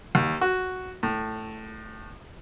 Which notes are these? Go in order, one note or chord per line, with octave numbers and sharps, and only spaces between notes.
D#2
F#4
A2